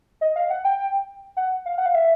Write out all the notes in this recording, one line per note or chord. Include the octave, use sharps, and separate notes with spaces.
D#5
F5
F#5
G5
F#5
F5
F#5
F5
E5